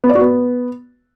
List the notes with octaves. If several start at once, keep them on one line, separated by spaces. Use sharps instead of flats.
B3
D5
F#4
B3